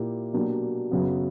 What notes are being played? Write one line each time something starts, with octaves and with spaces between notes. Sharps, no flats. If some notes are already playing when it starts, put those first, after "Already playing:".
Already playing: A#2 A#3 E4 G4
B2 F#3 A#3 D4 G4
F#2 C#3 F#3 B3